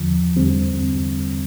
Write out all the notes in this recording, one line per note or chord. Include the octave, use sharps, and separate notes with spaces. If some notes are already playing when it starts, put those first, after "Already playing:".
Already playing: E2 D3 F3
E2 D3 G3 C4